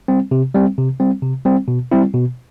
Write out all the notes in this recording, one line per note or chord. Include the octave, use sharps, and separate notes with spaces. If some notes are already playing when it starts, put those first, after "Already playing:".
G3 C4
C3
G3 C4
C3
G3 C4
C3
G3 C4
B2
G3 C4 E4
B2